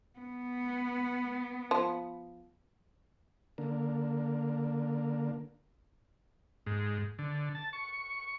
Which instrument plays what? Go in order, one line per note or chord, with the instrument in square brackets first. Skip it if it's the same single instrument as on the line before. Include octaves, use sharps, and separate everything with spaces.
[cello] B3
[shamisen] F3
[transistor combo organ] D3 A#3
G#2
D3
A5
C#6